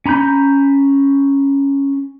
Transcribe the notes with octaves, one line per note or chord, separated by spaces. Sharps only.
C#4 A#5 B5 G6